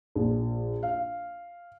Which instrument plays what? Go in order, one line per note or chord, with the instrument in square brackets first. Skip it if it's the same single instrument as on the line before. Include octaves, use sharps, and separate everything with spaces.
[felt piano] A#1
F5